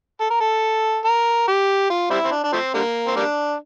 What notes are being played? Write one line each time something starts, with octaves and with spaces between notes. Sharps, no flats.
A4
A#4
A4
A#4
G4
F4
G3 C4 E4
C4
D4
D4
F3 A3 C4
D3 G3 A#3
C4
G3 A#3 D4